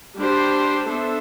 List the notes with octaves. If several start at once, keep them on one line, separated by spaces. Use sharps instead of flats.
G3 D4 G4 C5
B3 D4 A4 C5 E5